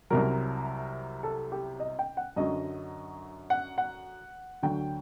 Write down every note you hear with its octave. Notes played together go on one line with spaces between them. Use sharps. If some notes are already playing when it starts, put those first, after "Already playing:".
C2 C3 F#3 A#4
A4
G4
D#5
G5
F#5
F#2 D3 F#3 D#5
F#5
F#5
D2 D3 F#3 G5